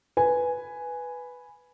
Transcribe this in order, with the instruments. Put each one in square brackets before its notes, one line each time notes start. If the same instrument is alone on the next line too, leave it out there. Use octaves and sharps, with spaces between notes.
[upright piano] B4 G#5